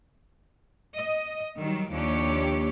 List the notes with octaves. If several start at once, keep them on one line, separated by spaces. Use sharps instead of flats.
D#5
D#3 F#3 G3
D#2 F3 D4 G4 C#5